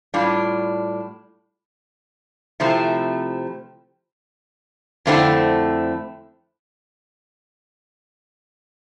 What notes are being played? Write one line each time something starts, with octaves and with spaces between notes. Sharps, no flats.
A2 G3 D4 F4
C3 F3 A3 C4 E4
F2 D3 A3 C4 E4